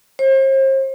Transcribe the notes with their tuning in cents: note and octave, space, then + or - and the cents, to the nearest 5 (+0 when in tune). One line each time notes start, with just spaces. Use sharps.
C5 +40